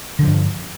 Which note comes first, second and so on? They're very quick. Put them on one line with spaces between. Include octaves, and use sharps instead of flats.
D3 F3 G2